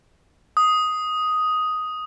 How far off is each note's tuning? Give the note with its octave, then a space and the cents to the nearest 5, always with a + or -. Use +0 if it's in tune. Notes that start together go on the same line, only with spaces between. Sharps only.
D#6 +5